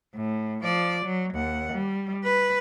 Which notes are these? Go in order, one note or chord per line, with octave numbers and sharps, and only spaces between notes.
A2
F3 D5
F#3
D#2 F#5
G3
B4